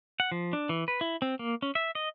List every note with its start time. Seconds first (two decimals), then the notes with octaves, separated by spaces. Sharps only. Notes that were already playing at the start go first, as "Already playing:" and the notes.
0.20 F#5
0.32 F3
0.53 D4
0.69 E3
0.88 B4
1.01 E4
1.22 C4
1.39 A#3
1.62 C#4
1.75 E5
1.95 D#5